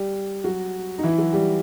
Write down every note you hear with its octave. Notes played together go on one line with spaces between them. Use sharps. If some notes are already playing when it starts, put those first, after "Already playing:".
Already playing: G3 G4
F#3 F#4
D#4
E3 E4
F#3 F#4
G3 G4